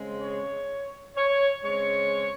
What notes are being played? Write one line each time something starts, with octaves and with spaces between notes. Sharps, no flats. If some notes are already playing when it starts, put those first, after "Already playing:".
Already playing: C#3 G#3 C4
C#5
C#5
C#3 G#3 C4 C#5